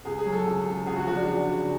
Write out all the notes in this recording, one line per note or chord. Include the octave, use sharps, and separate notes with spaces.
C#2 G#4
G#4
F#3
A4
C#2
C#3
C#2 G#4
F#4
F3 F#4
D4
C#2 D4
C#3